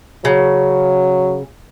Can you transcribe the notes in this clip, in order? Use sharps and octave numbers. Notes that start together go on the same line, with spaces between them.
C#3 F#3